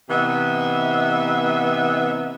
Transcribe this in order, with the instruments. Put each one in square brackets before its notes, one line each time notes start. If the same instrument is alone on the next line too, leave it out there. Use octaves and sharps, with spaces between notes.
[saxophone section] C3 E3 B3 D#5 E5